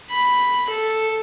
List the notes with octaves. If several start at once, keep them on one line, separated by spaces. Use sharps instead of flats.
B5
A4